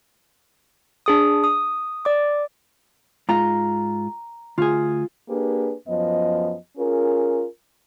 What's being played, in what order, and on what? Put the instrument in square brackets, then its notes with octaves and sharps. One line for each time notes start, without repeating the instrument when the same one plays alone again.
[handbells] D4 G#4 D#6
D#6
D5 D6
[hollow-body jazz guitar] G#2 F4 [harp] A#5
[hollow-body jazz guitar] D2 G#4 [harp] F4
[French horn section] A#3 D4 G4 G#4 B4
F#2 F3 B3 D#5
C#4 F4 G#4 A#4